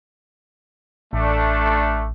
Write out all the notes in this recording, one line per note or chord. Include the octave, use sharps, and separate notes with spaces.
A1 A3 D4